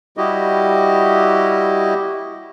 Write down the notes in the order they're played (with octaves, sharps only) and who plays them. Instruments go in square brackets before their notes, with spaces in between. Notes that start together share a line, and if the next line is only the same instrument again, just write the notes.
[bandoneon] G3 E4 F#4 G4 D#5